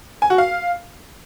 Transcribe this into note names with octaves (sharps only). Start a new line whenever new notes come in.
G#5
F#4
F5